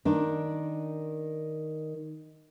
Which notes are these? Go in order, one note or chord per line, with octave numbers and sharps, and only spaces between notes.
D#3 D4